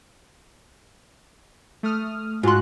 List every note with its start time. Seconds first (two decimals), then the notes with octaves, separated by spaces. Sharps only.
1.83 A3 D#6 F6
2.43 G#2 F4 F#4 C6 F#6